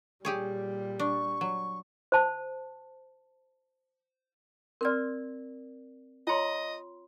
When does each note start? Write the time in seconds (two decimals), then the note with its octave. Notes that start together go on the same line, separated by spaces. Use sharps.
0.25 A#2 G3 G4 G#4 C#5
0.99 D4 C#6
1.41 F#3
2.12 C5 A5
4.81 C4 A#4 D5 C6 F6
6.27 F4 C#5 D#5 A#5 C6